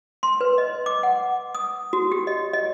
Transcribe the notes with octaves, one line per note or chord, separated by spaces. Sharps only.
C6
B4
D#5
D6
F#5
D#6
F#4
G4
D#5
D#5